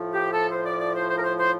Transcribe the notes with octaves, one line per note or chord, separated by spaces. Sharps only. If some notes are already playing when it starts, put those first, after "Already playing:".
Already playing: A2 F3
G4
A4
C5
D5
D5
C5
C5
A#4
C5
C5